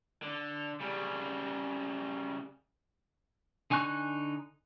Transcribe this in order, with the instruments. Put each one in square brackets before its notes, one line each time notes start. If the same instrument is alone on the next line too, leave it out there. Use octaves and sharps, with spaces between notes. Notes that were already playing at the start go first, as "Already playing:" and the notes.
[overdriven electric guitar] D3
C#3 G3
[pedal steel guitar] D3 D#4 G#5 C#6 F#6